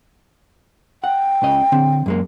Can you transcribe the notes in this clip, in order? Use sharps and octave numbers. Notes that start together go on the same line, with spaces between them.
F#5 G5
C#2 C#3 D#5
D3 C4
F#2 G#3 A#3